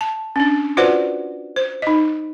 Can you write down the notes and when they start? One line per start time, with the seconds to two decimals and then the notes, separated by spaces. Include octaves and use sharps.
0.01 A5
0.36 C#4 D4
0.77 F4 F#4 B4 C5 D5 F#5
1.56 C5
1.82 D#4 D#5